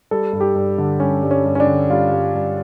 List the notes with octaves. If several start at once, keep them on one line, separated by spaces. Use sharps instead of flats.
G3 A4
G2
G4
G2
D3
G3 C#4
G2
C#4
G2
C#4
D4
D3
G3 F4
G2
G2